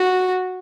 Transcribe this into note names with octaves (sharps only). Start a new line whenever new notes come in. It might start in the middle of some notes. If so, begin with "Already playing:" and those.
Already playing: F#4